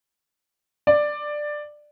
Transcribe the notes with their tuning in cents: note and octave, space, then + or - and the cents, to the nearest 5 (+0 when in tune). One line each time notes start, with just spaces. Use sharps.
D5 +10